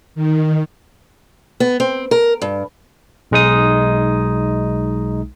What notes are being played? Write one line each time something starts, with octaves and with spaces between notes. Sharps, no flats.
D#3
B3
C4
A#4
G2
B1 G#3 D#4 D#6